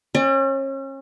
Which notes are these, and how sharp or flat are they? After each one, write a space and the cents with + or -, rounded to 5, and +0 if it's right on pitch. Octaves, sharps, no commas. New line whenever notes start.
C#4 -35 D5 +35